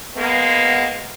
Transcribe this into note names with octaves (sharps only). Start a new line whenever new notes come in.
G#3 A#3 B3